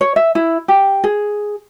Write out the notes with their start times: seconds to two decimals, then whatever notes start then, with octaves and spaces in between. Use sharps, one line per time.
0.01 C#5
0.16 E5
0.35 E4
0.68 G4
1.04 G#4